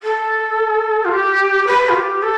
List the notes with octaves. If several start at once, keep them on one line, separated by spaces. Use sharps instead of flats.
A4
F4
G4
B4
F4
G4
A4